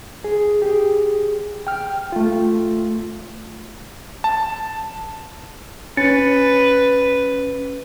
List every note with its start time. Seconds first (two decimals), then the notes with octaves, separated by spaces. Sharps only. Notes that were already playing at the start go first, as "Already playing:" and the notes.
0.24 G#4
0.62 G4 G#4
1.67 G5 F6
2.12 A3 F4
4.24 A5
5.97 C#4 B4 A6 C#7